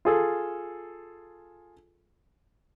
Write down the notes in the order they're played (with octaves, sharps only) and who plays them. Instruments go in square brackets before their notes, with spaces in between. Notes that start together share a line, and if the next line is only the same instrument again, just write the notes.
[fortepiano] F4 G#4 A4